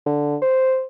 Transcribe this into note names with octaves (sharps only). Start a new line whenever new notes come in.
D3
C5